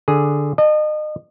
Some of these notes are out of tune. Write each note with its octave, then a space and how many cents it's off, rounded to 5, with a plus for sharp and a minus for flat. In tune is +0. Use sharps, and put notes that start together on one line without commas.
D3 +0 G#4 +0
D#5 -35 A5 +0